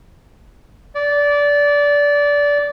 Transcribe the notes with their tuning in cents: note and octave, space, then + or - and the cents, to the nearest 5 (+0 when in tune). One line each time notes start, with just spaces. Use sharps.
D5 -20